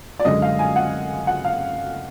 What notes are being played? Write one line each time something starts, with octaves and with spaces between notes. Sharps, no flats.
D5
F#2 D3 G#3 D#5
F5
G#5
F#5
F#5
F5